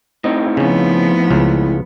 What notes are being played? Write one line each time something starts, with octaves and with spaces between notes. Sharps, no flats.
A2 C4 D#4 D#5
C#3 F3 B3 C#4
C#2 C#3